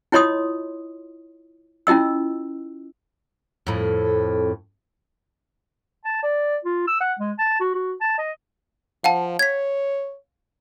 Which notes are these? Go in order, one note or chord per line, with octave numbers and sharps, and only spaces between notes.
E4 F4 C#5 D#5 C6 D#6
C#4 E4 F4 D#5 E6
F2 A2
A5
D5
F4
E6
F#5
G#3
A5
F#4
F#4
A5
D#5
F3 F5 F#5 A5
C#5 G#6 B6